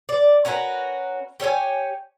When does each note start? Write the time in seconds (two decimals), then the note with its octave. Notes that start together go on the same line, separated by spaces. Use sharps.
0.09 D5
0.45 C#4 F#4 A#4 B4
1.40 G4 C#5 E5 G#5